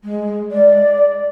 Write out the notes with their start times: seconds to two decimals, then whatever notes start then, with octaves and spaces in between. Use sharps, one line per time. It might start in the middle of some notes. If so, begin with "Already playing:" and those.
0.04 G#3
0.51 D5